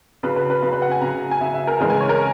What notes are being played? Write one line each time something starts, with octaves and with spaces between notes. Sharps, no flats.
C#3 F#3 B4
B4
B4
C#3 F#3 B4
B4
F#5
G#5
C#3 F#3 A#5
G#5
C#3 F#3 E5
E5
A#4
C#3 E3 G#3 A#4
G#5
C#5
A#4